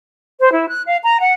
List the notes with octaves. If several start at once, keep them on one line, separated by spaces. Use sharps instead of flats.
C5
E4
F#6
F5
A#5
F#5